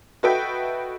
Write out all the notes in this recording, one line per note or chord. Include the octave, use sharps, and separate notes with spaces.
F#4 A4 B4 D#5 E5 G5